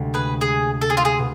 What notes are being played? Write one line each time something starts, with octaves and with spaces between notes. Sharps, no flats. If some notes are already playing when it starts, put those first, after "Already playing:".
Already playing: D2 C3 G#3
G#4 B4
G#4
A4
G#4
F4
G#4
B2